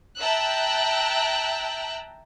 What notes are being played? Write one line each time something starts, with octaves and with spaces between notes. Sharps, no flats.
E5 G5 A5 A#5 E6 F#6